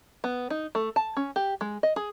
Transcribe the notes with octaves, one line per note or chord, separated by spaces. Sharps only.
B3
D#4
A3
A5
C#4
G4
G#3
D#5
G#4